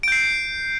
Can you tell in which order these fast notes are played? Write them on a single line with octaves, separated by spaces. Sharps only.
D7 G6 C7